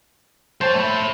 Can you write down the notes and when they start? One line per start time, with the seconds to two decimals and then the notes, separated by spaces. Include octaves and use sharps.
0.61 F3 C5 C#5 G5 A5
0.75 A3 B5